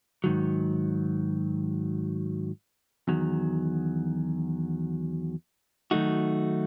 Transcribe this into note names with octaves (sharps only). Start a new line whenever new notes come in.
G#2 D#3 F#3
E2 D#3 F#3
D#3 F#3 A3 D#4 F#4